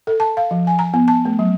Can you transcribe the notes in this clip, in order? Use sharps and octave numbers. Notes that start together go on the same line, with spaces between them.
A4
A5
F5
F3
G#5
A#5
B3
A5
A3
F#3